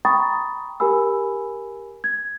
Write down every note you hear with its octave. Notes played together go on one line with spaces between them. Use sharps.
G5 A#5 B5 C#6 D#6 A6
G4 A#4 G#5 B5 E6
G#6